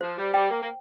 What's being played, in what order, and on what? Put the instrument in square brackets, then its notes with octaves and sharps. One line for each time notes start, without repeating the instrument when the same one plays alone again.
[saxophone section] F3 [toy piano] C5
[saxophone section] G3
[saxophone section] G3 [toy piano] G5
[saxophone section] A#3
A#3